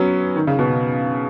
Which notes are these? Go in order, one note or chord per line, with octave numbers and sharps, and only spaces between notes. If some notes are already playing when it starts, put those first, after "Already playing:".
Already playing: F#3 B3 C#4
D#3
C#3
B2